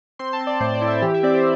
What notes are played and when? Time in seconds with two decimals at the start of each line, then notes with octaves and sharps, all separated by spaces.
0.19 C4 C6
0.33 A5
0.40 C4
0.47 D5
0.60 A2 C5
0.75 D5
0.81 E4
0.88 E5
1.02 E3 G4
1.14 E5
1.23 C4 D5
1.34 C5